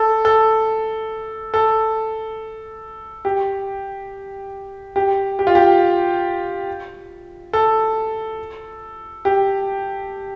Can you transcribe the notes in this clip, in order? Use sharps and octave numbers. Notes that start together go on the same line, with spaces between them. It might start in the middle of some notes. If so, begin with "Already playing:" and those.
Already playing: A4
A4
A4
G4
G4
G4
F4
G4
A4
G4